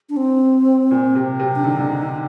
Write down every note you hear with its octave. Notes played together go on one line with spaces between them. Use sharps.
D4
C4
A#2
C3
C3
D4
D3 D#4
D3
D#3